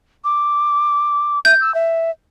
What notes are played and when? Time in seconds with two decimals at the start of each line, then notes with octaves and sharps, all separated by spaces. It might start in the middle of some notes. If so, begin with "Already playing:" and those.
0.24 D6
1.45 E5 G6
1.61 E6
1.74 E5